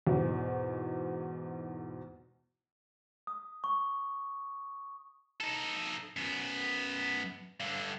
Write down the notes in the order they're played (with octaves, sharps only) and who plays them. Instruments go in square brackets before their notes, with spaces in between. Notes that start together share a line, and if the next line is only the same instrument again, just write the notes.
[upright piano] E2 G#2 B2
[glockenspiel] D#6
C#6
[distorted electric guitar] D#4 A4
F#2 B3
G2 D3